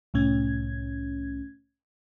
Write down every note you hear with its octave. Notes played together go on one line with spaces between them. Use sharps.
C2 A2 C#4 G#6